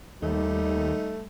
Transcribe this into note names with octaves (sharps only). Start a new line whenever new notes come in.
D#2 G3 A3 D#4